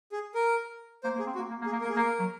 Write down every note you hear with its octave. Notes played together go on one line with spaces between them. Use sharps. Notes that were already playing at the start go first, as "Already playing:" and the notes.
G#4
A#4
A#3 C5
A#3
G#4
C4
F#4
A#3
A#3
A#3
G#4
A#3
A#4
A#3
G#4
A#3 A#4
F#3